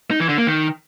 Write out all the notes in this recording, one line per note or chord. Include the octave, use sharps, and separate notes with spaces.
D#4
E3
D3
A#3
D#3